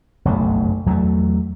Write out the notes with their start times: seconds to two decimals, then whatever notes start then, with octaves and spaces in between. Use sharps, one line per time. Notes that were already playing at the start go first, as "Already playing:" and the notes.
0.25 F#1 B1 G2 A3
0.86 E2 F#3 G3 A3